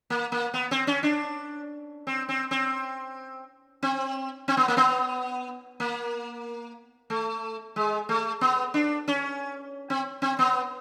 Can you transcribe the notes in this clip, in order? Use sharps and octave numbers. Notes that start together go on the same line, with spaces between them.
A#3
A#3
B3
C4
C#4
D4
C4
C4
C4
C4
C4
B3
A#3
B3
A#3
A3
G#3
A3
B3
D4
C#4
C4
C4
B3